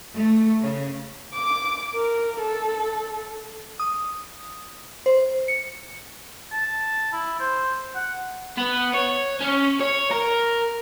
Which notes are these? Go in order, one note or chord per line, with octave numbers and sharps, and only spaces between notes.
A3
C#3
D6
A#4
A4
D#6
C5
C#7
A5
E4
C5
F#5
B3
C#5
C#4
C#5
A#4